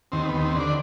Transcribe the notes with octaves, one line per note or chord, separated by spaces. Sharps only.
D#2 C4
B3
D#2
C4
D3 D4